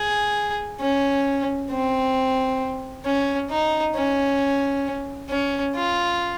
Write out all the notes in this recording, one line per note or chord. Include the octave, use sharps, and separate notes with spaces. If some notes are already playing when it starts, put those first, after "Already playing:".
Already playing: G#4
C#4
C4
C#4
D#4
C#4
C#4
F4